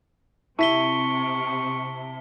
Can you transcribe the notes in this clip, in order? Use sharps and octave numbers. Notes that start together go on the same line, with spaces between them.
C3 E4 A5 C#6 B6 G7